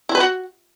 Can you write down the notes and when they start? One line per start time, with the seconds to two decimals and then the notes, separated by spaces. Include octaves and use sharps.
0.09 E4
0.15 B4
0.20 F#4